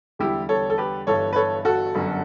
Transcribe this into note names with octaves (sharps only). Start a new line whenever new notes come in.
E2 D3 G3 E4 G4
A4 C#5
A4
G4 B4
G1 G2 E3 A4 C#5
B4
A4 C#5
F#4 A4
G1 F#2 D3 F#3